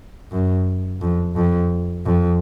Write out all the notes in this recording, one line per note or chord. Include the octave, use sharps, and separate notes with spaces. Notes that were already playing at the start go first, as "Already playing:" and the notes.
F#2
F2
F2
F2